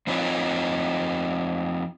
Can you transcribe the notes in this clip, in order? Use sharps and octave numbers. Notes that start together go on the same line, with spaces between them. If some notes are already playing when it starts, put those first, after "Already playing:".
F3 C4 D#4 F4 C#5